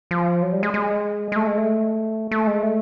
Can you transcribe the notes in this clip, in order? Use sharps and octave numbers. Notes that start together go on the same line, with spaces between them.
F3
F#3
G3
G#3
G#3
G#3
A3
G#3
A3
A3
G#3
A3